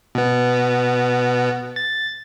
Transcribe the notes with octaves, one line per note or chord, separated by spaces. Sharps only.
B2 B3
A6